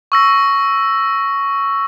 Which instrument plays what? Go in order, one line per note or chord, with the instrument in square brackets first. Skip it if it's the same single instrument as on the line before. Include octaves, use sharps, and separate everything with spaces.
[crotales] C#6 E6 A#6